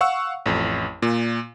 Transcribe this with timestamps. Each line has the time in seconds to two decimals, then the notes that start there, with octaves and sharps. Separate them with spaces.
0.01 F5 F#5 C#6 E6
0.46 A1 F2
1.02 A#2